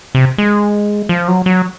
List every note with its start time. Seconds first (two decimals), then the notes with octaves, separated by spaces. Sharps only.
0.15 C3
0.38 G#3
1.09 F3
1.28 F#3
1.46 F#3